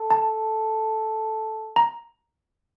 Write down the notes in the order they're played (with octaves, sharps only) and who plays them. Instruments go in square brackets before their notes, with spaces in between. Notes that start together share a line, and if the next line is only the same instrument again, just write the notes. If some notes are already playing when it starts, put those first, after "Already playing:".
Already playing: [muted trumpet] A4
[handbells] A5
A#5